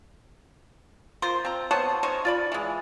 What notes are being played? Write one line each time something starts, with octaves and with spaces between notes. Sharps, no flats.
F4 A#4 C5
C4 F4 A#5
B3 C5 C#5 A5
C#4 D#4 C5 C#5
F4 D5 B5
E3 G#3